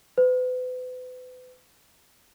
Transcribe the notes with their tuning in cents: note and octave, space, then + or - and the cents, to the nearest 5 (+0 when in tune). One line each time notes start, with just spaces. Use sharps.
B4 +40